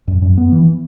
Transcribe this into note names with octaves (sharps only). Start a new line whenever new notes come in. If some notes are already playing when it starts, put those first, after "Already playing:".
F#2
F#2
B3
E3